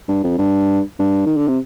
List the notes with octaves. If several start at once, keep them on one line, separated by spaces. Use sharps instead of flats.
G2
F2
G2
G2
D#3
D3
C3